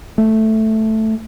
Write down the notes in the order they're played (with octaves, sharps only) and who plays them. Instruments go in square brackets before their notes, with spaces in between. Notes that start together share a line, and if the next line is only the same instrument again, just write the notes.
[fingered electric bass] A3